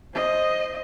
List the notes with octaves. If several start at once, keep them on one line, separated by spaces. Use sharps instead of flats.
C5 D#5